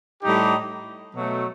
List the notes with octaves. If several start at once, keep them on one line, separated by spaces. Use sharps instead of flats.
A2 G3 D#4 G4
B2 F#3 A3